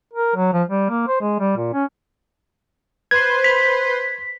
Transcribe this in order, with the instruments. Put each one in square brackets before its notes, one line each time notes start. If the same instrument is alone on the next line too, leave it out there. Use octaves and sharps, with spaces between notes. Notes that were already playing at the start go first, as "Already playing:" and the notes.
[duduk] A#4
F#3
F3
G3
A#3
C5
G#3
G3
A#2
C#4
[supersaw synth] B4 C5 C6 [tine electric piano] G#6
[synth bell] B6